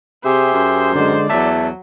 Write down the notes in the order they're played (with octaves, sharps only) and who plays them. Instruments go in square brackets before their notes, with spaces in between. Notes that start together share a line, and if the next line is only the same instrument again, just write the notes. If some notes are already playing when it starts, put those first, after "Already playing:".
[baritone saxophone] C3 [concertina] G4 G#4 E5 [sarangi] C5
[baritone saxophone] F#2
[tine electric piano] D3 G#3 [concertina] D5
[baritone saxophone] E2 [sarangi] F#3 [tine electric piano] E5 A5